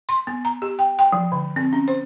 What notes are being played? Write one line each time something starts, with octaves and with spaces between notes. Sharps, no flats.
C6
B3
A#5
G4
G5
G5
F3
D3
C4
C#4
C5